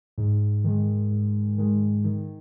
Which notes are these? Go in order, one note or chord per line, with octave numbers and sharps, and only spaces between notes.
G#2
D#3 G#3
G#2
D#3 G#3
D#3